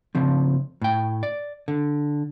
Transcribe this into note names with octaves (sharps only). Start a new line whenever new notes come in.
C#3 F3 C4
A2 G5
D5
D3